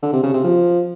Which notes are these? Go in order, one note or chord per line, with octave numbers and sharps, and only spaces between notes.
D3
C3
C#3
C3
F3